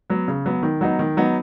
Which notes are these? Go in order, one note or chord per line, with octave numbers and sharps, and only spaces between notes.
F#3 B3
C#3
F#3 B3
D#3
F#3 B3 D#4
D#3
F#3 B3 D#4